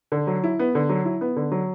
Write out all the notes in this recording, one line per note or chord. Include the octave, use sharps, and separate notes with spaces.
D3
F#3
E4
B3
D3
F#3
E4
B3
D3
F#3